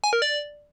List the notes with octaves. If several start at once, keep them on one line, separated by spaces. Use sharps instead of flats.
G#5
A#4
D5